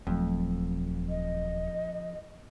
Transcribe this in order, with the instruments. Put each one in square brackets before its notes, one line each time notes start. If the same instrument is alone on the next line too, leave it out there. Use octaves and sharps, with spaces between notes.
[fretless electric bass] D#1 F#3 A3 [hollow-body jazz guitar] F2
[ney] D#5